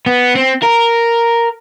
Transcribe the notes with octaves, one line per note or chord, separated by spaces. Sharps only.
B3
C4
A#4